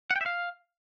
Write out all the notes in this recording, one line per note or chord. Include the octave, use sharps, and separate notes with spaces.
F#5
G5
E5
F5